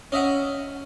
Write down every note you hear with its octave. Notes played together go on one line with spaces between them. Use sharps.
C#4 D#5 E5 F#5